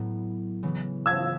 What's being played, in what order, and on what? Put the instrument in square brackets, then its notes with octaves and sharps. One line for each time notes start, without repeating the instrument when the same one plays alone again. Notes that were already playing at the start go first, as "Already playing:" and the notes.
Already playing: [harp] A2 F#3 B3
C#3 E3 B3
[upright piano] E6 G#6